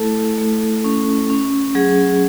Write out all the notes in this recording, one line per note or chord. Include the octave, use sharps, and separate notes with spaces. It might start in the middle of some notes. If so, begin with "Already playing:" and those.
Already playing: A3 E4 A4
A3
C#4
C#4
F#3 G#4